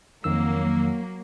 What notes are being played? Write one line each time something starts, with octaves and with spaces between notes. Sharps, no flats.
F2 D#3 F#3 A#3 E6